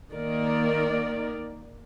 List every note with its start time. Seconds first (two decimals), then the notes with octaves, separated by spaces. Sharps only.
0.14 D#3 A#3 A#4 D5